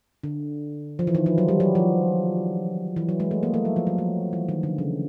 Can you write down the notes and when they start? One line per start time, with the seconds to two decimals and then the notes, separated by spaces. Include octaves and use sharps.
0.23 D3
0.99 F3
1.07 E3
1.15 D#3
1.26 F3
1.38 F#3
1.48 G3
1.60 F#3
1.75 F3
2.96 E3
3.09 F#3
3.20 G#3
3.31 A3
3.43 A#3
3.54 A3
3.65 F#3
3.76 F3
3.87 F#3
3.98 F3
4.33 E3
4.49 D#3
4.63 D3
4.78 C#3